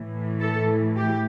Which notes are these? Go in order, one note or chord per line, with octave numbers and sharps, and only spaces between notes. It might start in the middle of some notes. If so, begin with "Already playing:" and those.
Already playing: A2 E3
A4
G4